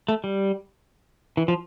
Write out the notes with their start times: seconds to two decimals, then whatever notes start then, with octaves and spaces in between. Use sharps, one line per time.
0.08 A3
0.24 G3
1.37 E3
1.48 F3